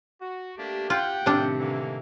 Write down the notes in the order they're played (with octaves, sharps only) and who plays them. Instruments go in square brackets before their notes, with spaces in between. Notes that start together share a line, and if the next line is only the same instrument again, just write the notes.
[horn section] F#4
[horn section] A3 A#3 D4 [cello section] G4
[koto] F4 [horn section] F#5 G5
[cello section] A2 C3 D#3 [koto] G3 D4
[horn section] D3 E3 A#3